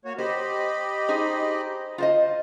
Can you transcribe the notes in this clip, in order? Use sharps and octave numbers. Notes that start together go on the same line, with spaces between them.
A#3 F#4 C#5
G4 C5 D#5 B5
D#4 G#4 C5
F4 C5 D#5